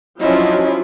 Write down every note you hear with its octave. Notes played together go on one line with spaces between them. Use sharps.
F3 F#3 C#4 D4 E4 F4 D#5